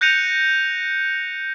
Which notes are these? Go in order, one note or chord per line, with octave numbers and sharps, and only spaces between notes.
F#6 G6 A#6 C#7 D#7 F7